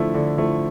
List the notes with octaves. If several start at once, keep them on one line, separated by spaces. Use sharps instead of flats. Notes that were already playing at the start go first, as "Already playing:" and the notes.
Already playing: D3 F3 A3 E4
D3
F3 A3 E4